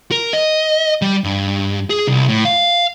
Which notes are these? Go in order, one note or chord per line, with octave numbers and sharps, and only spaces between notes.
A#4
D#5
G3
G2
G#4
C2
A2
F5